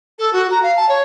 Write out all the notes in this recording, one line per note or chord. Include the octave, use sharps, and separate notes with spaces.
A4
F#4
A#5
F5
A5
C#5